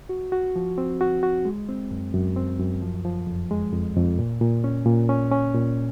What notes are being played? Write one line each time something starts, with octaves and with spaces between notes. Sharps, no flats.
F#4
F#4
F3
C4
F#4
F#4
G#3
C4
F#2
F#2
C4
F#2
F3
F3
F2
G#3
F2
F2
A#2
A#2
C#4
A#2
C#4
C#4
A#2